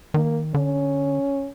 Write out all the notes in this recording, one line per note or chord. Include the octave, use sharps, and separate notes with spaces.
D#3 A#3
D3 C#4